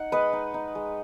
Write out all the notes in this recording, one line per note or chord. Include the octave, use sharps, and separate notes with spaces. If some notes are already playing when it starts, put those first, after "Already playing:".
Already playing: D#4 F#5
G#3 B4 D#5
D#4
D#4
G#3